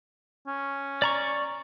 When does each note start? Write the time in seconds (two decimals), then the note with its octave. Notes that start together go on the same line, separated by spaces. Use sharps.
0.47 C#4
1.02 D5 A#5 C#6